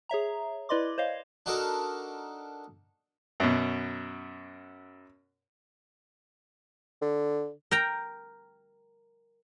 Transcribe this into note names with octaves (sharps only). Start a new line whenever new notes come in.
G#4 C#5 E5 A#5
E4 B4 D5 D#5 C6 D6
C5 C#5 D#5 F5
D4 D#4 F#4 A4 A#4
F#2 B2
D3
A#4 G5 A#5